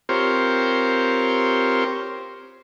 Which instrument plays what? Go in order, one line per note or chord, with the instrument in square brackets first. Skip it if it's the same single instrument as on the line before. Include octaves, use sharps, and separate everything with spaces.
[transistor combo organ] C4 F4 G4 A#4 C5 C#5